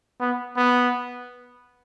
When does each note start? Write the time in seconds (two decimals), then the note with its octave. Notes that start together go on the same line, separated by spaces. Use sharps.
0.20 B3
0.57 B3